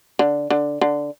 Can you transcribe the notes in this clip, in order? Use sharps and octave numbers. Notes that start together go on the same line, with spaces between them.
D3
D3
D3